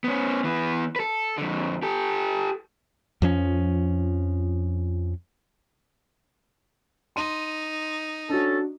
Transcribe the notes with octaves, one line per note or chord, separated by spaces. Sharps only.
B3 C#4
E3 B3
A4 B4
F2 D3
G4 A4
F2 F3 C#4
D#4 C6 D#7
C#4 D4 F#4 A4 A5